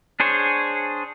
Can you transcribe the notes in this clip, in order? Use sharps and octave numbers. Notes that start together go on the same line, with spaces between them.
D4 G#4 C5 C#5